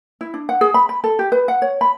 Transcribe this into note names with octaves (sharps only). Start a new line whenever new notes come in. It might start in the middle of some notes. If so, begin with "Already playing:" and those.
E4
D4
F#5
G#4
B5
B5
A4
G4
B4
F#5
C#5
B5